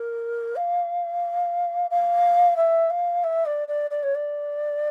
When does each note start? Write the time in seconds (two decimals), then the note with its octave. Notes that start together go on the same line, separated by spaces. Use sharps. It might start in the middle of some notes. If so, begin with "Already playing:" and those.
Already playing: A#4
0.56 F5
1.90 F5
2.56 E5
2.90 F5
3.24 E5
3.45 D5
3.68 D5
3.90 D5
4.03 C#5
4.15 D5